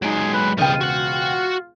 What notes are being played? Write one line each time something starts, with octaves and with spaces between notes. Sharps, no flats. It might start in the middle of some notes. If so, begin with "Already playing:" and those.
F#3 G#3 D#4 G#4 D7
B4
E1 C#2 G3 F4 D#5 G5
F#4 F#5